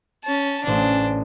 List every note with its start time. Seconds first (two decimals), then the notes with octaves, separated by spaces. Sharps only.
0.23 C#4 A5
0.63 A1 C#4 D4 C5